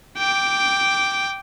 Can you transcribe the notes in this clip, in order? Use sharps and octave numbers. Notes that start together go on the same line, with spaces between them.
G5 D6